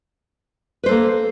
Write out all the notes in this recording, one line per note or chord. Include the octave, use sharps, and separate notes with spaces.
A#3 A4 B4 C5